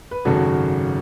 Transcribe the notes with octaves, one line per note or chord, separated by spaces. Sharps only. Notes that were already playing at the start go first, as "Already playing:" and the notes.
B4
G#1 F#2 C#3 F#4 A4